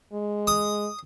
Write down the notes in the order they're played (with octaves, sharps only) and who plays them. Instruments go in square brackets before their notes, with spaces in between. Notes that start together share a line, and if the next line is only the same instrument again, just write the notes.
[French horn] G#3
[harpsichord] D#6